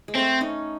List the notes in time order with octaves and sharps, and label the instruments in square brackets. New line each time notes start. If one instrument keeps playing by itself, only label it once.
[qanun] G#3
[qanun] A3 [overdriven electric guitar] C4
[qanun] C#4 D#4